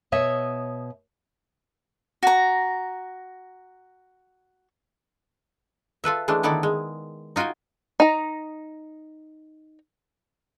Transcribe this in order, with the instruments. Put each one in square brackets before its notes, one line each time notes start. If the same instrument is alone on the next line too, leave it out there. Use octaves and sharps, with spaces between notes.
[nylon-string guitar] B2 C#5 D#5 E5
[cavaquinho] F#4 A#5
[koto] F4 A4 B4 E5
E3 G#3 A3 D4
D3 D#3 B3 E4 A4 D5
G#3
D#4 F4 F#4 G5 G#5
[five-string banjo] D#4 A#5